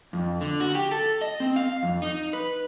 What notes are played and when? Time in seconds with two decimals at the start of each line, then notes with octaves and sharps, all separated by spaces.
0.13 F2
0.41 D3
0.60 F#4
0.75 G4
0.91 A4
1.21 D#5
1.40 C4
1.56 F5
1.83 F2
2.02 D#4
2.33 B4